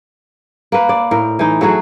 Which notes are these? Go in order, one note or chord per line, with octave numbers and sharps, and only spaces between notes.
A#3 B4
D5
A2 A#4
E3 D#4
F#3 A3 F#4 G#4